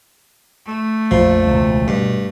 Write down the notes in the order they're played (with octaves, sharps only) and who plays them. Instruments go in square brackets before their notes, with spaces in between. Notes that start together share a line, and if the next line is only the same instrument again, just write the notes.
[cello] A3
[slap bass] A#1 F2 [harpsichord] F3
[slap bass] E1 C#2
[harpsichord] G2 [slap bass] B2